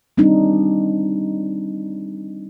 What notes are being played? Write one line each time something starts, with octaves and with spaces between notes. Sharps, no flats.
G3 C4 D4 D#4